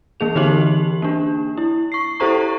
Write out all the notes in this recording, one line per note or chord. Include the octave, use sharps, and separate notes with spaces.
E3 A#3 G#4 F7
D3 E3 D#4 F#4 G4 F#7
A#3 D4
E4
C#6 C7
E4 G4 A4 C5 A#5 C#6